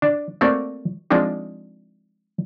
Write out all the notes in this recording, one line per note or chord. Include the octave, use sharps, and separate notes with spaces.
D4
A3 A#3 C4 F#4 D5
F3 G#3 C4 D4 D#4